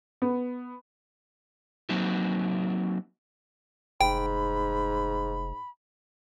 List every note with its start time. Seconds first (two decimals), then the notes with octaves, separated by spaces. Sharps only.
0.22 B3
1.89 F#3 A#3 C4 D#4 F#4
4.01 F1 G#2 G5 B5